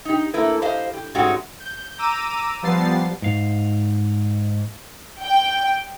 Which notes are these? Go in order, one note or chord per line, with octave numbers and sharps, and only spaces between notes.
D#4 G4
A3 A#3 E4 B4
G4 C5 D#5 F5
G4
G#2 G#3 A3 C#4 F#4 G4
G6
A#5 D6 E6 D#7
F3 G3 B3 A6 C7
G#2 F5
G5